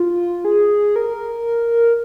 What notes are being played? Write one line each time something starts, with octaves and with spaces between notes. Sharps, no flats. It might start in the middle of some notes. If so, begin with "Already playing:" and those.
Already playing: F4
G#4
A#4